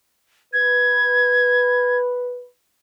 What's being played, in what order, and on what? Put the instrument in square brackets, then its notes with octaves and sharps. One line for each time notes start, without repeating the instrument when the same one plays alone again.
[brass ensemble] B4 [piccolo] G#6